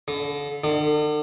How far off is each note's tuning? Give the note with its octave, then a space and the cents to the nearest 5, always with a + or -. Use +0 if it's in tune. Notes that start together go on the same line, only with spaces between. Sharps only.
D3 -35
D3 +40